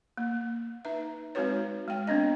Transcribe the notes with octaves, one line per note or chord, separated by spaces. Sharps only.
A#3
D#4 B4 E5
G#3 C4 D#4 F#4 B4 C#5
G#3 G5
B3 C4 D4 D#5